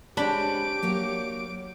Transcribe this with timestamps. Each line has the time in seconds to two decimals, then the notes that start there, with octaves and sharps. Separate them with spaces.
0.17 G#3 C4 D4 G4 C#5 B5 D6 D7
0.83 F#3 A#3 C#5